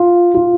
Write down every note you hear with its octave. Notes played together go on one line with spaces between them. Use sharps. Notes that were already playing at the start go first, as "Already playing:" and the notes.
Already playing: F4
F4